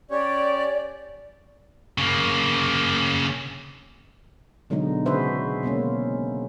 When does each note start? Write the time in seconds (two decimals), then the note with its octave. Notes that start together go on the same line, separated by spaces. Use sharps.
0.11 C#4 G4 C#5 D5
1.98 C#3 A#3
4.70 B2 D3 F#3 G#3 D#4
5.06 C#3 F#4 G#4 B4 C5 E5
5.63 B2 G#3 A#3 C#4